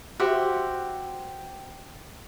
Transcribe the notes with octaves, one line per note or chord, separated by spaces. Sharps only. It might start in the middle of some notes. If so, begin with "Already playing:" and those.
F#4 G4 C5 E5